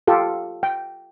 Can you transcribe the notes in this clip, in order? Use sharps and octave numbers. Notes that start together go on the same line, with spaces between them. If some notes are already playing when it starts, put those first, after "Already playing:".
F4 G4 A4
G5